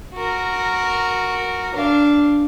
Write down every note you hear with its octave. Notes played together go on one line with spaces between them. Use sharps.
F#4 A#4
D4 F5